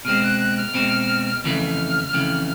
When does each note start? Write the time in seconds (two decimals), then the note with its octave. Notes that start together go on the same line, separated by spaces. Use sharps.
0.05 B2 G#3 C4 F6
0.23 F#6
0.40 F#6
0.57 F6
0.74 B2 G#3 C4
1.44 F2 C#3 E3 A3 F6
2.13 F2 C#3 E3 A3